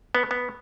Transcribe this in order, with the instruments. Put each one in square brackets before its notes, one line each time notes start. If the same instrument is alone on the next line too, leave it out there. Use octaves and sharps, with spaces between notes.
[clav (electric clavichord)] B3
B3